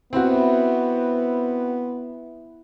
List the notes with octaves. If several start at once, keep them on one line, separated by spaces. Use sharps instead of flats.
B3 C4 E4 F#4 E5 F#5